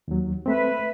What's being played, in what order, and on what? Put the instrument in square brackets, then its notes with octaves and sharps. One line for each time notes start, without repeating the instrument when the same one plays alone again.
[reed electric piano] D#2 F#3
[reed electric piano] A3 C4 [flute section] B4 E5